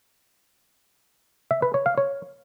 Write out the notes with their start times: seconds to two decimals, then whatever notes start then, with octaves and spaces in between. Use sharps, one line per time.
1.51 E5
1.62 B4
1.74 C#5
1.86 F5
1.98 C#5